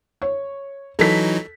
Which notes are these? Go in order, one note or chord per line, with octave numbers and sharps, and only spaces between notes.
C#5
E3 F#3 D#4 A4 B6